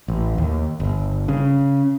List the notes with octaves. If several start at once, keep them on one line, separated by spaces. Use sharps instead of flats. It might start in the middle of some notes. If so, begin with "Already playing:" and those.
A1
D#2
G1
C#3